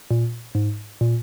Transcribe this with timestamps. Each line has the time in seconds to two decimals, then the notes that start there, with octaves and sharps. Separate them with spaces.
0.11 A#2
0.55 G#2
1.01 A#2